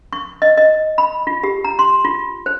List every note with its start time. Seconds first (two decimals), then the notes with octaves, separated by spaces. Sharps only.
0.13 C#6
0.42 D#5
0.57 D#5
0.98 B5
1.27 F4
1.44 G4
1.64 A#5
1.79 C6
2.05 F4
2.46 C5